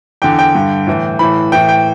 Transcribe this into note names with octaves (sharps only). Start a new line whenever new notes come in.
E2 D3 G5
G5
G2 D3
A2 E3
A2 E3 B5
A2 E3 G5
G5